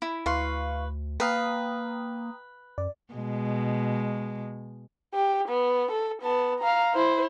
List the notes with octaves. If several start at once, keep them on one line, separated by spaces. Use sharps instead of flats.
E4 B5
D2 E4 B4 F5 C6 C#6
A#3 B4 F5 G5 A#5 D#6
F#2 D5
B2 G#3
G4
B3
A4
B3 A5
F5 A#5
E4 C5